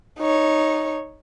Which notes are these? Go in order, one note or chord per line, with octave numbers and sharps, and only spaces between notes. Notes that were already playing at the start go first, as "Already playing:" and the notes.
D#4 C#5